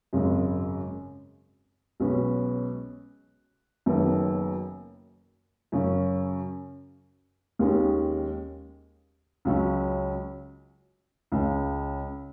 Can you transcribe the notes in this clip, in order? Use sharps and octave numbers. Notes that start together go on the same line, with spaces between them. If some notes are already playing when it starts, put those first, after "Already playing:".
G#1 F#2 C#3 G#3
B1 B2 G#3 C#4 B4
F#1 F#2 D#3 B3
F#2 C#3 F#3 C#4
D#2 D#3 G#3 C#4
C#2 C#3 F#3 C#4
C#2 C#3 G#3